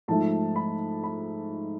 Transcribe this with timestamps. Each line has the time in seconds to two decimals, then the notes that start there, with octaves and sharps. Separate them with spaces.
0.08 G#2 F3 A3 A5
0.56 B5
1.04 B5